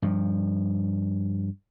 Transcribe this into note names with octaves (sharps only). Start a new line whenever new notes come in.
G2 F3